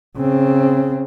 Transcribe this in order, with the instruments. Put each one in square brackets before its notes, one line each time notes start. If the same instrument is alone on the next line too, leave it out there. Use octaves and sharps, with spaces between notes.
[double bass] C#3 C4